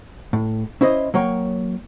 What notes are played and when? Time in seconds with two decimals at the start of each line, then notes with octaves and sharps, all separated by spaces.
0.33 A2
0.81 C#4 E4 C5 D#5
1.14 F#3 A#3 C#5 G5